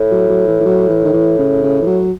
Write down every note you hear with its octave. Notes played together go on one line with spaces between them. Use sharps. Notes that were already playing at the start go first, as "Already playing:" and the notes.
Already playing: A2
F#3
F#3
E3
E3
F#3
E3
D#3
E3
C#3
C#3
E3
F#3